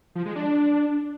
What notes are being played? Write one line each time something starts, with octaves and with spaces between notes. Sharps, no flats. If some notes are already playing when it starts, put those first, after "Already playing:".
F3
G#3
D4